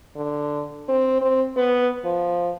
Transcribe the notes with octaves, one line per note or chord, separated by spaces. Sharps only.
D3
C4
C4
B3
F3